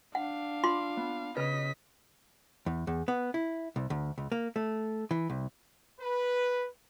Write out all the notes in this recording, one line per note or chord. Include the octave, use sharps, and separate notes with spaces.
D4 F5 F#5
F4 C6 D6
B3
C#3 B4 D#5 F6 B6
E2
E2
B3
E4
C2
D2
C#2
A#3
A3
E3
C2
B4